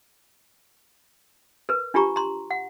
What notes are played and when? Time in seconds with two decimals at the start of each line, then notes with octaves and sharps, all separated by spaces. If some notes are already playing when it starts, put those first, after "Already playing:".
1.69 A#4 B4
1.94 D4 F4 G4 A#5 C#6
2.16 A#5 C6
2.51 F#5